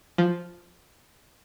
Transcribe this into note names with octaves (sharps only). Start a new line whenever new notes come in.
F3